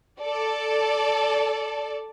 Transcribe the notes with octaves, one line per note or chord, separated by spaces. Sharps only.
A4 D5